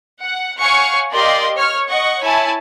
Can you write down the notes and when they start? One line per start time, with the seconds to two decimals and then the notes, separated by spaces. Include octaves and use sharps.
0.21 F#5
0.58 C#5 F5 F#5 G#5 C#6 F6
1.12 G4 A#4 D5 D#5 F5 C6
1.55 C#5 F6
1.87 D#5 F#5 C#6
2.22 E4 C#5 G#5 A5